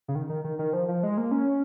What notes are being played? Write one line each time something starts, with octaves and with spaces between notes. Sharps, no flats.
C#3
D#3
D#3
D#3
D#3
F3
F3
G#3
A#3
C#4